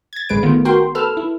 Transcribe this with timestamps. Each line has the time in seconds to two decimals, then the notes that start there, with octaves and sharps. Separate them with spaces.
0.13 G#6 A6
0.29 A1 G#3 B4 D7
0.43 D#3 A3 B3 F4
0.65 F#4 A#4 G5 C6
0.95 A4 B4 E6 F6
1.17 E4